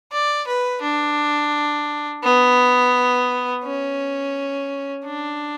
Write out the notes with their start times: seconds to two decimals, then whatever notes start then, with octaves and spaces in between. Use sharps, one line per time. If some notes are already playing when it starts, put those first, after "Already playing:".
0.12 D5
0.47 B4
0.82 D4
2.24 B3
3.64 C#4
5.05 D4